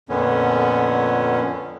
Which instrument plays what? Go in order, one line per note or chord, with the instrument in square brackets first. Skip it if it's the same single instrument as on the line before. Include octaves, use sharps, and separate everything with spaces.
[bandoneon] F2 A#2 D3 B3 C#4